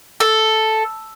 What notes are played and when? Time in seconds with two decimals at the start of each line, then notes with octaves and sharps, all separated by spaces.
0.20 A4